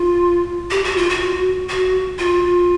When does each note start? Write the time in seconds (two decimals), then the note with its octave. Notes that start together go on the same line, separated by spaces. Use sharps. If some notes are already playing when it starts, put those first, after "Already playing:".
Already playing: F4
0.71 G4
0.84 F#4
0.97 F4
1.09 F#4
1.69 F#4
2.18 F4